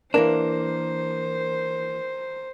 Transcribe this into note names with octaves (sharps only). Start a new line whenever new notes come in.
E3 A#3 D4 A#4 C5